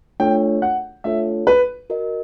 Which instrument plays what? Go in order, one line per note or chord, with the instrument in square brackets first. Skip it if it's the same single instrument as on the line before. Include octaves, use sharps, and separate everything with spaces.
[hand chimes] A3 D4 F4 A4 C#5 [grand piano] G5
[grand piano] F#5
[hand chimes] A3 D4 F4 A4 C#5 [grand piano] E5
[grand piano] B4
[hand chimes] F#4 A#4 D#5